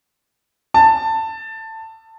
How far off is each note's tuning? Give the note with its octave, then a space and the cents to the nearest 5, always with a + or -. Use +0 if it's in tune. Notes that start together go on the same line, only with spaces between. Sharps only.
A5 +15